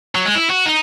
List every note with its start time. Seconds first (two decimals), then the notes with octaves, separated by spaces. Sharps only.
0.15 F#3
0.25 G#3
0.35 E4
0.50 F#4
0.66 D#4